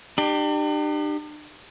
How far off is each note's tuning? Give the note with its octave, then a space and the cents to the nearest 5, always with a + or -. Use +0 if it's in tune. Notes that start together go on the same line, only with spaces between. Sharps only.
D4 +45 G4 +0